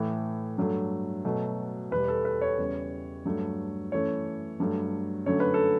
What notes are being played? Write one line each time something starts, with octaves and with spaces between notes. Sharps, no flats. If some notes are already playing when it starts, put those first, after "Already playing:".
Already playing: A2 E3 A3
G2 F#3 A3
B2 F#3 A3
E2 B2 G3 B4
A4
B4
C#5
E2 C#3 G3
G2 F#3 A3
F#2 E3 A3 C#5
G2 F#3 A3
F#2 D3 F#3 A3 C#5
B4
A4